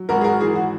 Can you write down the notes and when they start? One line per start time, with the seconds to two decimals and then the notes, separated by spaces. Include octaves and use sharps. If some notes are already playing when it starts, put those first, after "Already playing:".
Already playing: F#3
0.09 G#1 F#4 A#4
0.21 G#4
0.24 F#4 A#4
0.40 E3 G#4
0.55 F#4